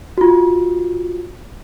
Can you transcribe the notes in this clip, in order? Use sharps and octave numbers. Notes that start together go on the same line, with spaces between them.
F4 F#4